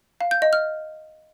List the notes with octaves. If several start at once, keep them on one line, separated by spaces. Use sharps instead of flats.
F5
G6
D#5
F6